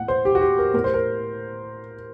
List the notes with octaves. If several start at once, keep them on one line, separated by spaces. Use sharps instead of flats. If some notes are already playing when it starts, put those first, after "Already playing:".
Already playing: A2 F#5
C5
G4
F#4
G4
A#4
A2 A#4
C5
A#4